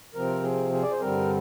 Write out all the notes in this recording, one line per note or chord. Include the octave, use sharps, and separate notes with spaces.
C3 F3 C4 A#4
G#4
G#4
D5
C5
G2 D3 G3 C4 A#4